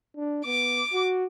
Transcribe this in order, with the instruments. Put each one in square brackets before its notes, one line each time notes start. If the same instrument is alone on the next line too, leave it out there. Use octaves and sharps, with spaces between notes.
[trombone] D4
[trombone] B3 [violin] D6
[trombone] F#4